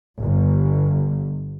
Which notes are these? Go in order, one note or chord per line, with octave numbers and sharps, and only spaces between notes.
G1